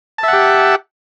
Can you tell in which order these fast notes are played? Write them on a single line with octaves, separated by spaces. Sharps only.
A5 E5 F#5 G4